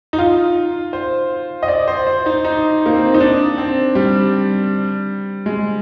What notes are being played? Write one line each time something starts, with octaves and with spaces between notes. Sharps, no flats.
D#4
F4
C5
D#5
D5
C5
C5
D#4
D#4
A#3
C4
D#4
D4
C4
G3
G#3